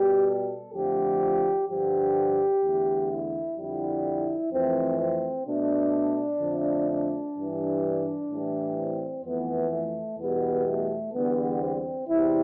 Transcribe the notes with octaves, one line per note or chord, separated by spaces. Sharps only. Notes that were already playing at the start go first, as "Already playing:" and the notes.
Already playing: B2 G3 G4
A4
F2 D3 F3 A3 G4
G2 D3 F3 G4
E2 D3 A3
E4
F2 D3 G3 E4
F2 E3 A3 C4
C4
B2 A3 D4
F2 D3 A3
D4
G2 E3 G3
A2 E3 G3
C4
F2 E3 A3 B3
A3
E2 B2 G3 B3
A3
E2 D3 G3 B3
C4
E2 C3 G3 E4